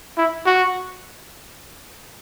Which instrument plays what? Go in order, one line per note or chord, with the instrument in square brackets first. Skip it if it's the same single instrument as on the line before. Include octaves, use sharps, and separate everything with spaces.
[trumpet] E4
F#4